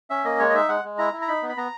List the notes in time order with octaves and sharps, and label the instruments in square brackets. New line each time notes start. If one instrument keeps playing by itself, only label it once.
[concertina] C#4 E5
A#3 D#5
G#3 C#5
D#5
D#4 E5
G#3 F#5
G#3
E4 A#5
E4
A#5
D#4 B5
B3
B5
B3 A#5